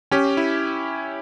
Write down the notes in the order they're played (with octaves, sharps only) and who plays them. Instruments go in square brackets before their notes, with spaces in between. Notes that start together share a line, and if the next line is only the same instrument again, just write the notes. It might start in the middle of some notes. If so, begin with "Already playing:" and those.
[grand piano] C#4 [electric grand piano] G4
[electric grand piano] E4